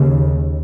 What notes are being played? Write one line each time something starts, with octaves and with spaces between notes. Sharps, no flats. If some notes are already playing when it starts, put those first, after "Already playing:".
Already playing: D#2 C#3